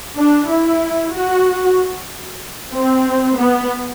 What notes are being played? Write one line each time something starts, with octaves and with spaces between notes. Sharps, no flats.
D4
E4
F#4
C4
B3